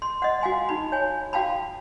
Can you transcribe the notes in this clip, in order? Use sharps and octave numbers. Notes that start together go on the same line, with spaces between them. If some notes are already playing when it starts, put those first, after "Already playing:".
C6
D#5 F#5
F#4 F5 G#5 C6
D#4 F#4 B5
C#5 G#5
F#4 F5 G5 A5 B5